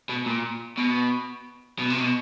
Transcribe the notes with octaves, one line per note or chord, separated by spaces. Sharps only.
B2
A#2
B2
B2
C3
B2